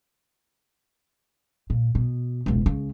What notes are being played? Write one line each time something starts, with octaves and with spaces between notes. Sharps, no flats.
A#2
B2
E1 C#2
C#2 C#3